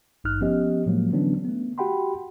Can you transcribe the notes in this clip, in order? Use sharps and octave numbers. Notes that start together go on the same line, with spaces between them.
G#1 G2 D#4 F6 F#6
F3 B3 C#4 G4 D#5
A2 F3 F#3 G#3 A#3
D3 E3 F#3 B3 C#4 D4
A3 B3
F#4 G4 F#5 G5 B5 C6